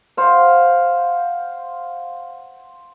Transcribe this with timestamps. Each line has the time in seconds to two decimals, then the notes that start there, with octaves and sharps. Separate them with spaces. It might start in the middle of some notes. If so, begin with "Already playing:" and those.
0.17 C5 F5 F#5